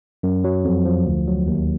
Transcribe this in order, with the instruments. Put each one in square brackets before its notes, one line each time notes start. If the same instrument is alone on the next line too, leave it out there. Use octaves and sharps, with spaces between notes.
[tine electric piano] F#2
F#3
F2
F3
D2
F#3
D#2